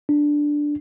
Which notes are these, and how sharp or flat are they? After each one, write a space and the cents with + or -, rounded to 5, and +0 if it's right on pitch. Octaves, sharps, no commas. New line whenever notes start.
D4 +0